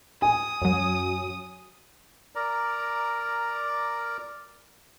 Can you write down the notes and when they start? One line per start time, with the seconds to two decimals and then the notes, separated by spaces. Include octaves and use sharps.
0.22 G#5 D#6
0.62 F#2 F#3
2.35 A#4 D5 A#5